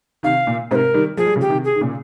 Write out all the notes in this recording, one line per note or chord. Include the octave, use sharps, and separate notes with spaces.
C3 D#3 F5
A#2
G#2 C3 C5
A#4
D#3 G3
F3 G#4
G3
C#3 F3
G4
C3 D#3
G#4
D#3
A#2 C#3